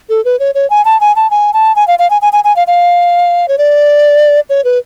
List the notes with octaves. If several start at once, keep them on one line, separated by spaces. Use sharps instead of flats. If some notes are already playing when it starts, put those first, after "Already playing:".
A4
B4
C#5
C#5
G#5
A5
G#5
A5
G#5
A5
G#5
F5
F5
G#5
G#5
G#5
G#5
F5
F5
C#5
D5
C#5
B4